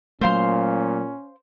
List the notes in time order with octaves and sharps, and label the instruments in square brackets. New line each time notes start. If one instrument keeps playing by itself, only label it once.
[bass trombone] A#2 [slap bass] F#3 A3 [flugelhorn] C#4 [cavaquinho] C5 F5 C6